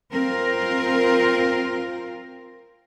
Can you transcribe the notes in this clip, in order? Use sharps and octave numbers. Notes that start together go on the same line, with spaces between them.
C4 F4 A#4